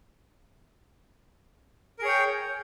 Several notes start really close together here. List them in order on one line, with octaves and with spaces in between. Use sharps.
A#4 G#4 C#5 G5